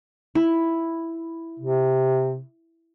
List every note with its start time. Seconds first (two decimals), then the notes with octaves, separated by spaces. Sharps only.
0.35 E4
1.60 C3